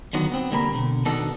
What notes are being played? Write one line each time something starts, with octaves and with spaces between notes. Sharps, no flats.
D3 D#3 F#3 B3
B3 C4
C2 D3 G3 A#3 A#4 B5
B2 D3
B2 D#3 B3 D4 A4